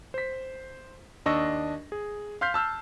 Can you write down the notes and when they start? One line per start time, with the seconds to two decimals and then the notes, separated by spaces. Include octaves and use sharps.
0.14 C5 B6
1.26 D#2 D4 D#5 C#6 E6 A#6
1.92 G#4
2.41 F5 C6 F6 G6 B6 C7
2.54 A5 E6 F6 G6